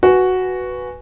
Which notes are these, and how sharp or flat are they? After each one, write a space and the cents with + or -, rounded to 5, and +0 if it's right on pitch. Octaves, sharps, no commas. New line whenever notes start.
F#4 +0 B4 +0 G#5 +0